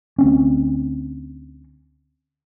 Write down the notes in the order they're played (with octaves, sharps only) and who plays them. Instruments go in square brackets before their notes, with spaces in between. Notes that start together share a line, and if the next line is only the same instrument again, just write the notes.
[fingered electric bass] D2 C4 C#4